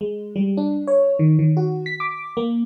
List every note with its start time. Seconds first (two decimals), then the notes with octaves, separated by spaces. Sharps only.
0.01 G#3
0.36 G3
0.57 D4
0.87 C#5
1.19 D#3
1.39 D#3
1.57 F#4
1.86 B6
2.00 D6
2.37 A#3